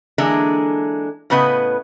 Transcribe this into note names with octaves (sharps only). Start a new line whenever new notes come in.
D3 E3 G#3 A#3 D4
A2 C#3 B3 B4 D#5